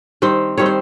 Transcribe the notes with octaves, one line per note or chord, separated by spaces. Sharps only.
D#3 G3 C4 C5
D#3 G3 C4 C#5
C5